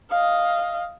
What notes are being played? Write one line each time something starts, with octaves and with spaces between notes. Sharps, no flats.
D#5 F5